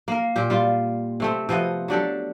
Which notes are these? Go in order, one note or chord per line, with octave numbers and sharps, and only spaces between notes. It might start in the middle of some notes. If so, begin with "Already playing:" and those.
A#3 A#4
A#2 G4
G3 F4
C3 A3 C4
C3 F3 B3 D#5
F#3 D4 G4 A4